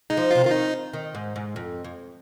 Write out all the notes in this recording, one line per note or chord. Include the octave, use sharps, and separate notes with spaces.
G#3 D#4
F3
C3 F4
D#3 F4
D#4
D#3
G#2
G#2
F2
F2